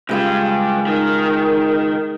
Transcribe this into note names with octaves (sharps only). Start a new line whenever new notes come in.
G2 C#3 G3 G#3 F4
D#3